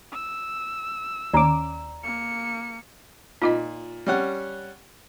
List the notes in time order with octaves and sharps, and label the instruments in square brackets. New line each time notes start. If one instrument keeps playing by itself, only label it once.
[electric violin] E6
[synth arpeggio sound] D#2 C#4 D6 [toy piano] D5 A#5
[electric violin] A#3 C#7
[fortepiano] A#2 [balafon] D#4 F4 D#5
[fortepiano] G3 C#4 F#5